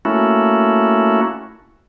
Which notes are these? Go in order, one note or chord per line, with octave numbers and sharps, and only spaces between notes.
A3 A#3 C#4 E4 F#4